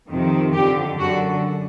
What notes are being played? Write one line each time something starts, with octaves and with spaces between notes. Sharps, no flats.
F2 C3 D#3
F2 D3 G4
F#2 D3 F#4